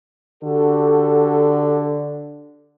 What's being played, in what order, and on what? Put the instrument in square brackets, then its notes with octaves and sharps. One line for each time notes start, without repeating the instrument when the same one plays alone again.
[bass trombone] D3 [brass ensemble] F#4 G4 A4